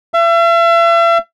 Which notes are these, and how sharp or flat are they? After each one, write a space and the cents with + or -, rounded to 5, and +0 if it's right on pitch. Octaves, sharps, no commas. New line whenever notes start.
E5 +40